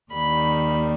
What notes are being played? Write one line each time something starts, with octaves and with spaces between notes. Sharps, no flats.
D#2 D#3 G3 B5